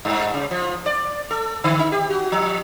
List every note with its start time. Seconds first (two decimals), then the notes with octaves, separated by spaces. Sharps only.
0.05 G2
0.34 C#3
0.51 F3
0.86 D5
1.31 A4
1.64 D3
1.79 D#4
1.92 G4
2.10 F#4
2.32 F3